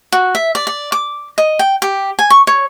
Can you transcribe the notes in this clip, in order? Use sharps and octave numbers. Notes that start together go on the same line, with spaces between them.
F#4
E5
D5
D5
D6
D#5
G5
G4
G#5
C#6
C#5